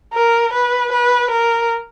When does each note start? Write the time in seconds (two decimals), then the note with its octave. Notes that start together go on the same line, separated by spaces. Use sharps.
0.13 A#4
0.53 B4
0.92 B4
1.31 A#4